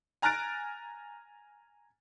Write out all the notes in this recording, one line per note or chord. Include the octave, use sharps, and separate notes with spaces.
G#5 A#5 F6 F#6 A6 D7